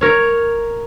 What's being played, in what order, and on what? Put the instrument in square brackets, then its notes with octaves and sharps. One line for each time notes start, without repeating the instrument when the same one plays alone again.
[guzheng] A#4 C#5